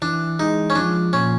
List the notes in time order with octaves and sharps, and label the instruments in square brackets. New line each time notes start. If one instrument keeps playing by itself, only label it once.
[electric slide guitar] E3 [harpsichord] D4
[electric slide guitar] G#3 [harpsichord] D#4
[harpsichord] C#4
[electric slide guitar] F3 [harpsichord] D4
[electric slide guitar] A#2 [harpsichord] C#4